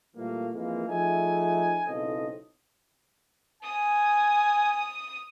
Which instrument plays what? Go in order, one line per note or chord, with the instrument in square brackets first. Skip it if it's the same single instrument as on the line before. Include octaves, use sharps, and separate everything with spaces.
[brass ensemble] A#2 E3 G3 A3 A#3
F2 E3 G#3 A#3
F3 A3 D#4 G#4 E5 G#5
B1 C#3 C4 E4 A4 D#5
[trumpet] G#5 [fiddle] D#6